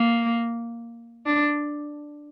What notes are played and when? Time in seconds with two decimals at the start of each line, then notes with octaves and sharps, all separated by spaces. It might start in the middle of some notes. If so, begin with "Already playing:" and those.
Already playing: A#3
1.26 D4